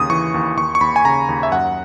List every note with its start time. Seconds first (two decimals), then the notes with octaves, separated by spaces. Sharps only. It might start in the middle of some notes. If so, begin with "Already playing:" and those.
Already playing: D#2 C#3 D#6
0.10 E3 C#6
0.34 D#2
0.57 D#2 C#6
0.75 C#6
0.81 D#2 B5
0.96 G#5
1.05 C#3 A#5
1.29 D#2
1.43 E5
1.51 F#2 F#5